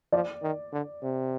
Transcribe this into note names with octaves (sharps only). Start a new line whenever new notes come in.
F3 D5
D#3
D3
C3